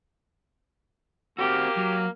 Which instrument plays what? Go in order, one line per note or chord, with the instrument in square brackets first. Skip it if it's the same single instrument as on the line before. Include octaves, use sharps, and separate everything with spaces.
[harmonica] A#3 F6 [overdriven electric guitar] C4 F#4 [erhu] G4
[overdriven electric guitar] F#3